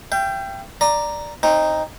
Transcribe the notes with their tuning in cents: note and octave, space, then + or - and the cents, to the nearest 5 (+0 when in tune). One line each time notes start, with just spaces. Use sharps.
E5 +45 G5 +0
D5 +5 A#5 +0
C4 +30 D#4 +0